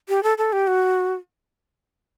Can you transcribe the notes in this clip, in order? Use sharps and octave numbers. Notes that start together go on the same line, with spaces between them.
G4
A4
A4
G4
F#4